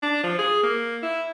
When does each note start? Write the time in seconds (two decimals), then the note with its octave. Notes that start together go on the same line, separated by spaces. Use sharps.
0.03 D4
0.23 F3
0.39 G#4
0.63 A#3
1.03 E4